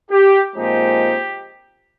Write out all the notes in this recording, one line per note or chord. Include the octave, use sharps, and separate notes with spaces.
G4
A#2 F3 G#3 C4 D#4 G4